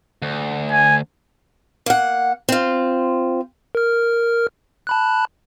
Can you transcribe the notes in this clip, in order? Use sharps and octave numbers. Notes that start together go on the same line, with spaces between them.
D2
G#5
A#3 F#5
C4 F4
A#4 F6
A5 B5 F#6